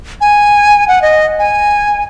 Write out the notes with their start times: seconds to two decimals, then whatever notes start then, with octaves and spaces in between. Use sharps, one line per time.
0.21 G#5
0.88 F#5
1.02 D#5
1.39 G#5